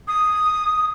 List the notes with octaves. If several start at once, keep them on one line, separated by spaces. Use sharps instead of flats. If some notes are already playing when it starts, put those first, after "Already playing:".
D#6